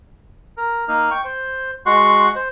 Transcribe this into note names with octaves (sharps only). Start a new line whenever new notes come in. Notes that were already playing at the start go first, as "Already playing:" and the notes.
A#4
A#3 D#4 F6
G5 C#6
C5
G#3 F#4 F#5 C6 C#6
C5